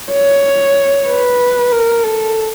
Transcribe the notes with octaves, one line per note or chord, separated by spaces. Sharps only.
C#5
B4
A#4
A4